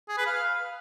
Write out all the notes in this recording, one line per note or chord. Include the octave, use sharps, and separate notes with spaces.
G#4
B4
F5